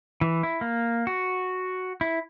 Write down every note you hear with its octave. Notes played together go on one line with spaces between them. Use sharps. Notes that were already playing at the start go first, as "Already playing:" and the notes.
E3
E4
A#3
F#4
E4